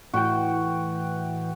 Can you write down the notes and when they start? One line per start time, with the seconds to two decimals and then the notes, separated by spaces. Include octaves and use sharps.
0.14 A2 E3 F#4 G5